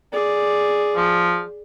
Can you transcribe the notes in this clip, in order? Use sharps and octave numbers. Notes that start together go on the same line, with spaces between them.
G#4 D5
F3